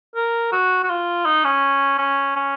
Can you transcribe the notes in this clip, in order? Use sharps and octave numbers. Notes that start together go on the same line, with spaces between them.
A#4
F#4
F#4
F4
D#4
C#4
C#4
C#4